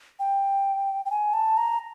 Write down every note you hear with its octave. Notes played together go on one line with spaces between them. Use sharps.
G5
G5
G#5
A5
A#5